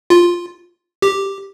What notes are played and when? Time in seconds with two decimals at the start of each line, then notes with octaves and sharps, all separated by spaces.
0.10 F4
1.02 G4